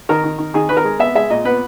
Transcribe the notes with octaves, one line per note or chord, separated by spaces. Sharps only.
D#3 A#4
D#3
D#3
D#3 G#4
D#3 B4
A#4
G#3
B3 E5
G#3 E5
A#2 D#5
B3 B4